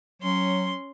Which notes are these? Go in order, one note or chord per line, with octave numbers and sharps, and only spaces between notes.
F#3 C#4 C6